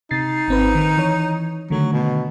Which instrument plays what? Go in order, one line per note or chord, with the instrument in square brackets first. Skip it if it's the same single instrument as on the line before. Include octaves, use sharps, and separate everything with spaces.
[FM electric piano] C3 A6 C7 [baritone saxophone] D#4
[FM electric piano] G#1 C4 B4
D#3
E3 C#5
[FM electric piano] D3 D#3 A3 [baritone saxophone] F#3
[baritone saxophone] B2